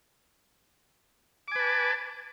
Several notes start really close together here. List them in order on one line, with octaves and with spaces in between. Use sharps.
D6 G#5 B4 A5